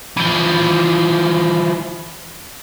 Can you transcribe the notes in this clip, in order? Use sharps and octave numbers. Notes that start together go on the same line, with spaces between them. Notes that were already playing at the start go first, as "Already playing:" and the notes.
E3 F3